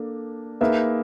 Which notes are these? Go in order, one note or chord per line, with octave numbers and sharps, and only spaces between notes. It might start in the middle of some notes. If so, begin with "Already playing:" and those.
Already playing: A#3 D4 A4
A#3 D#4 G#4 B4 E5